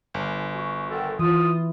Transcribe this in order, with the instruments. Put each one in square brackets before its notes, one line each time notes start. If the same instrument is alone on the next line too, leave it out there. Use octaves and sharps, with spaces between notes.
[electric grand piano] G1
[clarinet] F#4
[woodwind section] D3 D#3 [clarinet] A4
[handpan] E3 [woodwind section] F4 [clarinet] D#6